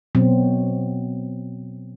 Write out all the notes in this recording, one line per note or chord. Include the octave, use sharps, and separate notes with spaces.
B2 F#3 C4